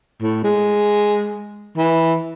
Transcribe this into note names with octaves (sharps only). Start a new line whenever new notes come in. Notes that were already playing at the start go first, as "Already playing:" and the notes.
A2
G#3
E3